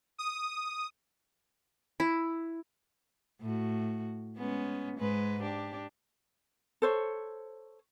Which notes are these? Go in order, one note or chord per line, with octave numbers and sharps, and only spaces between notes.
D#6
E4
A2 F#4
G#3 B3 C#4
G#2 G#3 B4
D4 G4
A4 C5 C#5